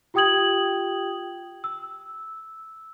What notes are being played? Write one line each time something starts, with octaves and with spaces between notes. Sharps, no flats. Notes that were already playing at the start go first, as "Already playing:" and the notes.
F4 G4 G5 D#6 G#6 F#7
E6